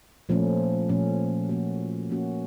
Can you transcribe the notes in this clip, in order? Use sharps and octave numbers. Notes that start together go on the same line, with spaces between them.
A#2 F3 A3 C#4
A#2 F3 A3 C#4
F3 A#3 C#4 F#4
F3 A#3 C#4 F#4